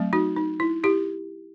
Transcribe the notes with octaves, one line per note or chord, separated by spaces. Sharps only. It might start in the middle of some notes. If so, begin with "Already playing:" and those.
Already playing: F#3 A3 C4
D#4 F#4
D#4
E4
E4 G4